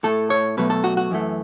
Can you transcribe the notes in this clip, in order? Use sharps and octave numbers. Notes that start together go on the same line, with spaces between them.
A2 A3 A4
C#5
B2 F#3 A3 B4
A4
F#4
F#4
F#2 E3 A3